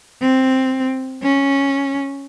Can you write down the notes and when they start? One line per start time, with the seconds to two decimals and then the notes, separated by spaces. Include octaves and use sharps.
0.21 C4
1.23 C#4